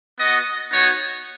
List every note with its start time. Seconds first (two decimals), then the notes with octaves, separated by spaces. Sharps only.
0.20 B3 F#4 D#5
0.72 B3 D#4 F#4 C#5